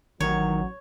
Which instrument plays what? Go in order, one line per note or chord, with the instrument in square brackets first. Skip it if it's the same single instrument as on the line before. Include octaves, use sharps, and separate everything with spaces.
[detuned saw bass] A1 [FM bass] D#3 [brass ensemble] F#3 [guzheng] C#5